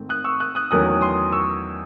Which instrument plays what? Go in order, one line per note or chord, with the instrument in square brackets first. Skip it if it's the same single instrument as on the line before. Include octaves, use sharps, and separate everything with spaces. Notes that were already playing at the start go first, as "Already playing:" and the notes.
Already playing: [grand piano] G#2 D#3 A3 C4
D#6 F#6
C#6 E6
D#6 F#6
D#6 F#6
E2 D#3 F#3 A3 C#4 D#6 F#6
C6 D#6
C#6 E6